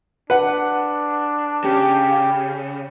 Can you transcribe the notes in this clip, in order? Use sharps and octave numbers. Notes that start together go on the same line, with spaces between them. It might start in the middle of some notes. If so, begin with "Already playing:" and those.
D4 B4 F#5
C#3 G4